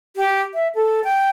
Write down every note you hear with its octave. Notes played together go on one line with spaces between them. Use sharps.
G4
E5
A4
G5